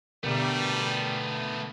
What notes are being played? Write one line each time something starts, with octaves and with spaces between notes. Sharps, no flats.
B2 D3 G3 A3 B3 A#4